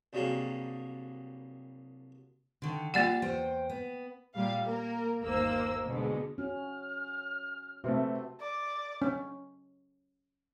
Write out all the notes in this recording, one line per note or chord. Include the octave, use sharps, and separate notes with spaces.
C2 G2 F#3 G3 A#3 G#4
D3 D#3
G3 A#3 F4 D5 F#5
E2 C5 G5
B3
A#2 G3 F5
A#3 A#4
G1 D#2 A#3 C5 E6
B2 D3 G#3
C#4 F#4 F6
C3 A3 F#4 B4
D5
C#4